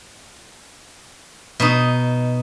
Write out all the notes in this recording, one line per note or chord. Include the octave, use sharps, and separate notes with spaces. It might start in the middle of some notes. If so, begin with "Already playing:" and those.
B2 D#4